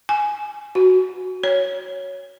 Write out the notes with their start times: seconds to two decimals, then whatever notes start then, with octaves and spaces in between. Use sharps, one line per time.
0.09 G#5
0.75 F#4
1.44 C#5